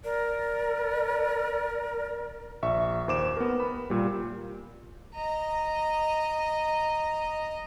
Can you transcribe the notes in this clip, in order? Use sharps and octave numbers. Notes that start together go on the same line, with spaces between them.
A#4 D5
A#1 E5 C#6
D#2 C5 D6 E7
B3 A#4
B5
A#2 G3
D#5 A#5